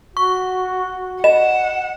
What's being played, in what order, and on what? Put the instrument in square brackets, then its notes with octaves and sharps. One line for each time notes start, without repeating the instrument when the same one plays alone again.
[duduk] F#4 [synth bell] C#6
[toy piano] D#5 [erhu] F#5 [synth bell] E7